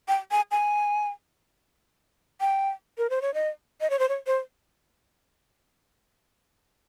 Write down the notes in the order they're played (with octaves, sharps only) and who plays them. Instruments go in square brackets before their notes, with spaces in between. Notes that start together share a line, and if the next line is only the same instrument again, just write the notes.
[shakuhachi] G5
G#5
G#5
G5
A#4
C5
C#5
D#5
D#5
C#5
C5
C#5
C5